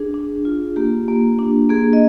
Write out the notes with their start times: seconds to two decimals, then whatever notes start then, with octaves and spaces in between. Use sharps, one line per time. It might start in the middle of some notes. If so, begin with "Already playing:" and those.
Already playing: D4 G#4
0.14 D4
0.45 F4
0.76 A#3 G4
1.08 A#3
1.39 D4
1.69 A#3 G#4
1.93 D#5